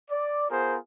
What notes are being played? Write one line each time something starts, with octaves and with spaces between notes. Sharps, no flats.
D5
B3 F4 G#4 A#4 C5